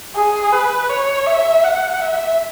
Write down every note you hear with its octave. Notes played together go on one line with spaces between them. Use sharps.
G#4
B4
C#5
E5
F#5
E5